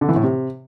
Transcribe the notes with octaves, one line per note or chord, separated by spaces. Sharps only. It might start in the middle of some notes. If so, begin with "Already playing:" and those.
D3
E3
A2
C3